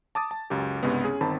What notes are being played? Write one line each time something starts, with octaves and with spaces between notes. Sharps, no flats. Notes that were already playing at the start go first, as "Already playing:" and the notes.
A5 D6 D#6 A6
A5
C#2 F#2 G4
C2 G2 C#3 G#3 B3
C#4 G#4
G1 D#3 C4 A5 B5